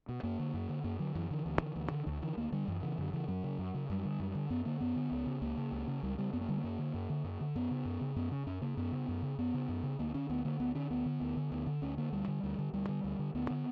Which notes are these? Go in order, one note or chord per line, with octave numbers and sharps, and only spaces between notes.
B2
F#2 A#3
D3
F#2
D3
F#2 A#3
D3 F#3
F#2 E3
D3 E3
D2
D3
D2
D3
D2 D3
D3 E3
D2 A#3
D3 G3
F#2 E3
C#3 E3
F#2 D3
C#3 E3
F#2 F#3
C#3
F#2
C#3
F#2 G3
D3
F#2
D3
F#2 B3
D3 A#3
F#2 B3
D3
C#2
C#3
C#2 A#3
C#3
C#2
C#3
C#2 G3
C#3 G3
F#2 B3
A#3
D3 G3
A#3
F#2
D3
F#2
D3
F#2
D3
F#2 B3
C#3
F#2
C#3
F#2 B3
C#3 C#4
F#2 C#4
C#3 A#3
F#2 B3
C#3
F#2
C#3
F#2 B3
C#3
F#2
C#3
D2 A#3
D3 C#4
D2 B3
D3 A#3
D2 B3
D3 C#4
D2 B3
D3
D2
D3
D2
D3
D2 C#4
D3 A#3
D2 G3
D3
D2
D3
D2 G3
D3
D2
D3
D2 B3
D3